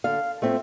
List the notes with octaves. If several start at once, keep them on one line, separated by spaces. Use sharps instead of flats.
D3 F5
A3 C4 F4 E5